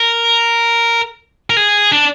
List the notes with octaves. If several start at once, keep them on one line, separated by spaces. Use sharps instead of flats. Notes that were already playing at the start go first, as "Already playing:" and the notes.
Already playing: A#4
A#4
G#4
D4